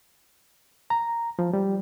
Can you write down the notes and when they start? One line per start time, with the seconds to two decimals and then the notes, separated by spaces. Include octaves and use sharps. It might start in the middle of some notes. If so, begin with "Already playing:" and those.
0.90 A#5
1.39 F3
1.53 G3